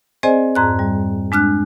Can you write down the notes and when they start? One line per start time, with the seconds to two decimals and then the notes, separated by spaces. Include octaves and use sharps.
0.23 C4 G#4 C5 D5 D#5 G#5
0.55 F2 G#2 A#5 F#6
0.79 G3
1.32 G#3 D4 F6 F#6